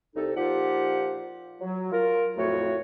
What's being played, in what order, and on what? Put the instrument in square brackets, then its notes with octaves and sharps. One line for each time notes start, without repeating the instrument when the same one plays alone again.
[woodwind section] C2 C3 D#4 A4
A#2 F3 D#4 F4 G4 F#5
F#3
F4 A#4
F2 A2 A3 F#4 C#5